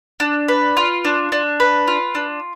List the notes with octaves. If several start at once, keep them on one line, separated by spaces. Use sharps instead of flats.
D4
B4
F4
D4
D4
B4
F4
D4